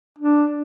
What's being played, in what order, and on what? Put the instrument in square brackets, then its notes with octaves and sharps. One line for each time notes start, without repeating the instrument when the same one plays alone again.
[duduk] D4